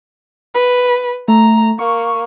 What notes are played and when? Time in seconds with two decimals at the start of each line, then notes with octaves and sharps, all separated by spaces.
0.55 B4
1.28 A3 A#5
1.79 A#3 C#6